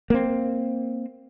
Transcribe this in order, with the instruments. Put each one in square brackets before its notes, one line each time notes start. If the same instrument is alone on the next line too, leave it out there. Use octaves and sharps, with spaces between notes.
[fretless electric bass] A#3 C4